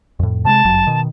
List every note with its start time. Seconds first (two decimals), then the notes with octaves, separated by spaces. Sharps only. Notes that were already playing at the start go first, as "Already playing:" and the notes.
0.19 F2 A2
0.45 C3 G3 G#3 A5
0.65 G1 F#2 F#3
0.87 B2 D#3